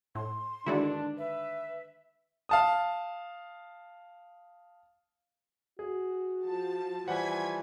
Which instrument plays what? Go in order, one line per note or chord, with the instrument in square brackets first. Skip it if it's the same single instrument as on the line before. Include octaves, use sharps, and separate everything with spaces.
[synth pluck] A2 [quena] C6
[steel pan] D3 D#3 G#3 [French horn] D4 [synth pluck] E4 F#4 D5
[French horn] B4 [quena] E5
[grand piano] F5 A5 D#6
[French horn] F#4 [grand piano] G#4
[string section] F3 A5
[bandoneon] E3 F3 G3 [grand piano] C5 F#5 [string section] G#5 G#6 B6